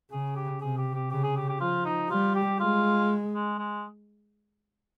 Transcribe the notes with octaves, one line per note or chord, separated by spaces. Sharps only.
C#3 G#4
G4
C3 G#4
G4
G4
C#3 G4
G#4
G4
G4
F3 F4
D#4
G3 F4
G4
G#3 F4
G#3
G#3